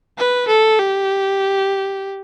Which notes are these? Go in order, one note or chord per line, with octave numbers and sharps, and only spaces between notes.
B4
A4
G4